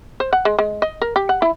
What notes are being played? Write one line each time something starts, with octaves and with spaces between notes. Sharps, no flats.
C5
F#5
G#3
G#3
D#5
A#4
G4
F#5
E4